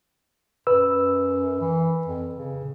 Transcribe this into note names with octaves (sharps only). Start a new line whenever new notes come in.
F#2 B4 E6
E3
F2
C#3